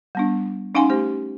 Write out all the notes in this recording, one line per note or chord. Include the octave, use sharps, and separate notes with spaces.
G3 B3 D4
C#4 D#4 F5 F#5 G#5 C6
A3 G4 C5